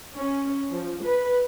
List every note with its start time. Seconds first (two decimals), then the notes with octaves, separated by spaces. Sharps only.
0.16 C#4
0.73 F3
1.05 B4